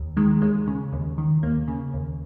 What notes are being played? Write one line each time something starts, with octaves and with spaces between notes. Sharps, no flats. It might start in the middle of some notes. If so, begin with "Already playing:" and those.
Already playing: D#2
D#3 G#3
D#2 G#3
C#3
D#2
D#3
D#2 A#3
C#3
D#2